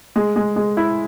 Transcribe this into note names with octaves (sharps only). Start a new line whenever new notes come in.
G#3
G#3
G#3
E4